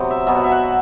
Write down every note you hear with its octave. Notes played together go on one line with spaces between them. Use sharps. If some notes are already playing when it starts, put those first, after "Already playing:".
Already playing: C3 F#3 B3 C5
E5
B2 F#3 B3
F#5
E5
F#5